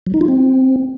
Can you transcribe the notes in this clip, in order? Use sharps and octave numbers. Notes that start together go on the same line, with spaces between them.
F#3
D#4
F4
C4